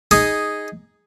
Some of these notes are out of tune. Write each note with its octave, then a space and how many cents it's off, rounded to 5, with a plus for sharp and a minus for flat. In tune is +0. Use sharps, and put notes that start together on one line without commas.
D#4 +0 G#4 -5